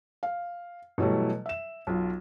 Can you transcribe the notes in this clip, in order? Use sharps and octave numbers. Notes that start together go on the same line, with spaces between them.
F5
B2 E3 F#3 G3 A3
E5 E7
B1 F4